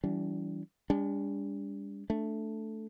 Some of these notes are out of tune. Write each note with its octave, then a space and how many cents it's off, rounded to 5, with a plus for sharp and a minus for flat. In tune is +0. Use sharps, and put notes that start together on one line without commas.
E3 +0 G3 -25 D4 -45
G3 +45 D4 -35
A3 +0 D4 +0